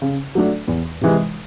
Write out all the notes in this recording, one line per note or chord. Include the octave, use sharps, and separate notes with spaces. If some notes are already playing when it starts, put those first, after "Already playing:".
C#3
F#3 A3 D4
E2
C3 E3 G#3